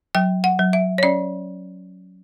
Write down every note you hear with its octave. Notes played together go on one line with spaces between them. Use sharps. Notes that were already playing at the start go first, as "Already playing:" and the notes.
F#3 G5
F#5
F#3
E5
C#5
C#4 D5